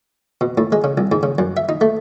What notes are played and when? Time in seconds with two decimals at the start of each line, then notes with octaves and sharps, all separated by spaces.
0.41 B2
0.58 A2
0.72 G#3
0.84 C#3
0.98 C2
1.12 G#2
1.23 C#3
1.38 F#2
1.57 E5
1.69 D#4
1.81 A3